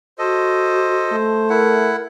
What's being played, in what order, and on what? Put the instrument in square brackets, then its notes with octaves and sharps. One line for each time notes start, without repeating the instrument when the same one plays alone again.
[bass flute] F#4 [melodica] A4 D#5 [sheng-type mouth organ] C5
[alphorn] A3
[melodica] E4 F#5 [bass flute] A#4